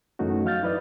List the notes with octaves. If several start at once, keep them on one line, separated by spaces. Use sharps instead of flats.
F#2 E3 A3 C#4 D#4 F#4
F#3 F5 F6 G6 A6
E4 B4 D5 D#5